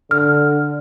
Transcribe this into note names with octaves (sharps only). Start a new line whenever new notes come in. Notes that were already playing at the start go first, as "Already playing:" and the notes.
D3 F6